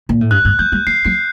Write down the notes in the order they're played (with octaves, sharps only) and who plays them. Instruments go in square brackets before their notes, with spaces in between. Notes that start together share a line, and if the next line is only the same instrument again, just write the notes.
[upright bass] A#2
A2
[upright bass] G2 [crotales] F#6
[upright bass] G2
[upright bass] F#3 [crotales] G6
[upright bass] G3
[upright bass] F#3 [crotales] C7
[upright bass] F#3 [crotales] C7